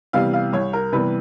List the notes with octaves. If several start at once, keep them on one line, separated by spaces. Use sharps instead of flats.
C3 E3 G3 B3 F5
F5
C2 C#5
A#4
C3 E3 G3 B3 B4